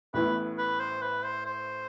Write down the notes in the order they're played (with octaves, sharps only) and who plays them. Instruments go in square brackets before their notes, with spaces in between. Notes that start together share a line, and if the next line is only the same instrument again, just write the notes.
[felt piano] A1 A2 E3 B3 E4 [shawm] B4
[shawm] B4
C5
B4
C5
C5